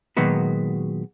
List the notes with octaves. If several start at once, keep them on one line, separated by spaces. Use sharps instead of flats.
A#2 D#3 F#3 G#3 B3 F#4